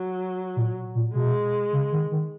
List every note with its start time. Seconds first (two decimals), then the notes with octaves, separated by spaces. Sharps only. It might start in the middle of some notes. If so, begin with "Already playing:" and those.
Already playing: F#3
0.56 A#2
0.95 A#2
1.15 B2 G#3
1.73 C#3
1.92 D#3
2.12 D#3